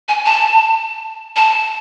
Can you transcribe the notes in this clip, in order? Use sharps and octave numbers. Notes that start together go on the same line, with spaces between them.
G#5
A5
A5